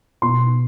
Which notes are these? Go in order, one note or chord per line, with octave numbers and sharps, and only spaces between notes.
B2 C6